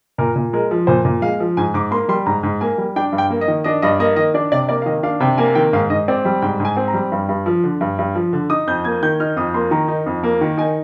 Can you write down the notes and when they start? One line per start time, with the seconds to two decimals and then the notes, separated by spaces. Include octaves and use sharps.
0.18 A#2 A#4
0.36 A#2
0.53 G#3 A#4
0.71 F3
0.87 A#2 C5
1.05 A#2
1.22 G#3 F5
1.40 F3
1.57 G#2 G#5
1.74 G#2 D6
1.91 A#3 C6
2.08 G3 C6
2.26 G#2 A#5
2.43 G#2
2.61 A#3 G#5
2.78 G3
2.96 D4 G5
3.12 G2
3.18 G5
3.30 A#3
3.41 D#5
3.48 D#3
3.64 D4 D#5
3.82 G2 D#5
3.99 A#3 D#5
4.16 D#3 D#5
4.34 D4 D5
4.52 C3 D5
4.69 A#3 D5
4.82 F5
4.86 D#3 D#5
5.03 D4 F5
5.20 C3 G5
5.38 A#3 G#5
5.55 D#3 G5
5.73 G#2 F5
5.90 G#2 D#5
6.08 C4 D5
6.25 G3
6.42 G#2 G5
6.60 G#2
6.65 G#5
6.77 C4
6.88 A#5
6.94 G3
7.12 G2
7.29 G2
7.46 F3
7.64 D3
7.81 G2
7.99 G2
8.15 F3
8.33 D3
8.50 D#4 D#6
8.67 F2 G6
8.84 A#3 G#6
9.03 D#3 G6
9.20 D#4 F6
9.37 F2 D#6
9.54 A#3 C6
9.71 D#3 A#5
9.88 D#4
10.06 F2
10.23 A#3
10.41 D#3
10.58 D#4 G#5